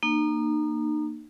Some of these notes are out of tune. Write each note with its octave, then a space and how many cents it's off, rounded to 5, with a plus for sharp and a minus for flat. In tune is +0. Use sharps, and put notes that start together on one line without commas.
A#3 +0 D#4 -40